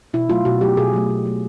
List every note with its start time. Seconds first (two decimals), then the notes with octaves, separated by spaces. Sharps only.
0.14 B2 E4
0.29 F#3 A3 F4
0.45 B2 F#4
0.61 F#3 A3 G4
0.77 B2 G#4
0.93 F#3 A3
1.10 B2
1.25 F#3 A3